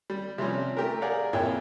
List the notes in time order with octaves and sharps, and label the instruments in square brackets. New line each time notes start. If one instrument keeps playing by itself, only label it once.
[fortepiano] G3
C3 F3 G3 C#4
A3 G4 A#4
G#4 A#4 D5 F5 F#5
A#1 F2 A#3 E4 C#5 G5